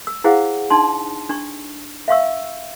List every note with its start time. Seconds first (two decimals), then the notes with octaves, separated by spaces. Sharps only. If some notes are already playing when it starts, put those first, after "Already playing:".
0.07 E6
0.24 E4 G#4 C5 F5 F#5
0.70 D4 D#4 A5 C6
1.29 D4 C#6
2.08 E5 F5 C#6 E6